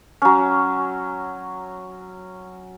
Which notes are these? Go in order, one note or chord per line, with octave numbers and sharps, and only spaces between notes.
F#3 C#4